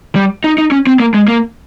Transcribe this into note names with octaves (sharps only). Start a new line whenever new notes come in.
G3
D#4
D#4
C#4
C4
A#3
G#3
A#3